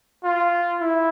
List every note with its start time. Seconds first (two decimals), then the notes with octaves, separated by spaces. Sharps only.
0.24 F4
0.81 E4